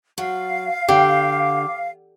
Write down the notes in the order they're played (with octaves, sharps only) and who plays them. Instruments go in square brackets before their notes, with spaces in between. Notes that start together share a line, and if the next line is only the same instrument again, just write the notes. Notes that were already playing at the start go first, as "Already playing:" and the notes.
[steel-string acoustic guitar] F#3 [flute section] F5
[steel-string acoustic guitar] D3 [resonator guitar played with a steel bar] G4 [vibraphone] D6